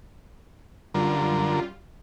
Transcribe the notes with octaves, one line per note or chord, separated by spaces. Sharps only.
F#2 D3 G3 F4 A#4